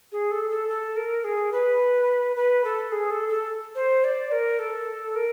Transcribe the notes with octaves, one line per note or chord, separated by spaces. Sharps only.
G#4
A4
A4
A4
A#4
G#4
B4
B4
A4
G#4
A4
A4
C5
D5
A#4
A4
A#4